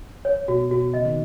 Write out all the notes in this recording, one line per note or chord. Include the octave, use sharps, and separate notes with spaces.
C#5
B2 F#4
B2 F#4
C#3 D#5
D#3